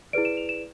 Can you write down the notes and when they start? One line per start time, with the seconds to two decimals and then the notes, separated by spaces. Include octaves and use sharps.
0.13 E4 G#4 B4 D5 D7
0.25 E7
0.37 F7
0.49 E7